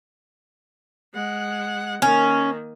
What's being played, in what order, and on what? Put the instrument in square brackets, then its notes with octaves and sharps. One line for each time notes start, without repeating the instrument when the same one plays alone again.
[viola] G#3 F#5
[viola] D#3 A#3 [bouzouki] C#4